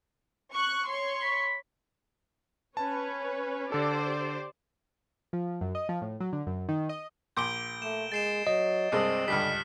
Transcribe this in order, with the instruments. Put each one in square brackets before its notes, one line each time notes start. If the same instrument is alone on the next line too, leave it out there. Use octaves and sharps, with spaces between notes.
[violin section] C#6 F#6
C#5 C6 C#6
[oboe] B5
[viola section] C#4 B4 C#5 [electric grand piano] A5
[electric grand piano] D3 A4 [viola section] G4 C5 D5
[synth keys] F3
F#2
D#5
F3
A2
F#3
D3
F#2
D#3
D#5
[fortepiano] A#1 C6 D6 [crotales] G6 D7 G7
[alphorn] A3 [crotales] E7
[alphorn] G#3 [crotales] A6 C7 E7
[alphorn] F#3 [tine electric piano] D#5
[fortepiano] C2 G2 G#3 [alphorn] C4 [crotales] D#6 E6 C7
[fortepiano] C#2 G2 G3 [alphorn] D3 [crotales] F6 B6